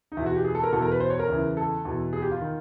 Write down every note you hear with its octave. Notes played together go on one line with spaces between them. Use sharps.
D#4
E2 B2 E4
F#4
G4
G#4
A4
A#4
E2 B2 A4
A#4
B4
C5
C#5
A#4
E2 C#3 E3
A4
E2 B2
G#4
G4
F4
D#3